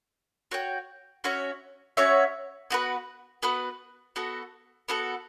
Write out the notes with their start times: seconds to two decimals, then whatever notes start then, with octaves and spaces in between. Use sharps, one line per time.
0.51 F#4 C#5 G5
1.24 C#4 F#4 C#5 E5
1.97 C#4 F#4 C#5 E5
2.70 B3 F#4 B4
3.43 B3 F#4 B4
4.16 B3 F#4 A4
4.88 B3 F#4 A4